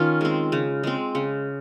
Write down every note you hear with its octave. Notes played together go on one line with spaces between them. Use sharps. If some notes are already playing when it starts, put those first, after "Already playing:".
Already playing: D#3 C#4 D#4 F4
G#3 C4
C#3
G#3 C4
C#3